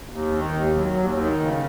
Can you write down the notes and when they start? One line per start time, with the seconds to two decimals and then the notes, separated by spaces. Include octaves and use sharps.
0.10 D#2
0.31 D#3
0.53 D#2
0.75 F#3
0.97 D#2
1.18 D#3
1.40 C#3